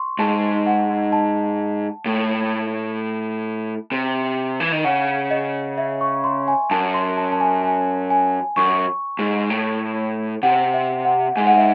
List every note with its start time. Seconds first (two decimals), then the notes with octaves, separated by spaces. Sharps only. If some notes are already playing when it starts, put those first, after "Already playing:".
Already playing: C6 C#6
0.19 G#2 A5
0.66 F#5
1.12 A5
2.06 A2
3.92 C3
4.60 E3
4.72 D#3
4.84 C#3 F#5
5.31 D#5
5.78 E5
6.01 C#6
6.24 C6
6.48 G#5
6.71 F#2 A5
6.94 C6
7.17 A5
7.32 A5
7.40 G#5
7.63 G#5
8.10 G#5
8.57 F#2 C#6
9.19 G#2
9.50 A2
10.43 C3 F#5
10.74 E5
11.05 F#5
11.36 G#2 G#5
11.47 F#5
11.57 E5